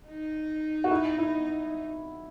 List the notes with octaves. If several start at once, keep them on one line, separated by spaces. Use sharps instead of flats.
D#4
F#4
E4
E4